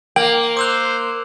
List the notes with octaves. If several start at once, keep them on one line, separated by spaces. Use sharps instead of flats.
A#3 G5 F#7
C5 D6 E6 F#6